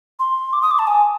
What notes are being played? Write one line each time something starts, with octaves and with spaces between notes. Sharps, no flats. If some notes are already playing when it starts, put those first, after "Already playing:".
C6
D6
D#6
D6
A5
G#5